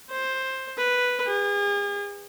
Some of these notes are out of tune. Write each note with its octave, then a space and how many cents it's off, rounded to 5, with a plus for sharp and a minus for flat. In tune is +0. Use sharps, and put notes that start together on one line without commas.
C5 +10
B4 +0
G#4 -40